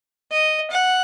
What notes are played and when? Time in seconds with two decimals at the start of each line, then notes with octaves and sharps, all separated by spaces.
0.32 D#5
0.71 F#5